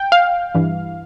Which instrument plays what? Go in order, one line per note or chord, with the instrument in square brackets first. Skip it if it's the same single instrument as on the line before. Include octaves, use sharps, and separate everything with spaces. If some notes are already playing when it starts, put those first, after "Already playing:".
Already playing: [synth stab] G5
F5
G2 E3